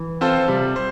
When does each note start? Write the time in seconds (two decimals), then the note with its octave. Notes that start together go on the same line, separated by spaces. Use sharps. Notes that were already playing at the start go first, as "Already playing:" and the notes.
Already playing: E3
0.21 C4 F4 A4 C5
0.48 C3 G3
0.76 C5